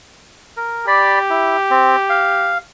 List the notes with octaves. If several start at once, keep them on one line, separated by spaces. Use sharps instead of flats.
A#4
G4 D5 B5
E4
C4
F5